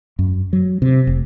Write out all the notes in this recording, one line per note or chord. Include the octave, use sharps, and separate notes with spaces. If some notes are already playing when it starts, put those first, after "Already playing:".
F#2
F#3
C3
F1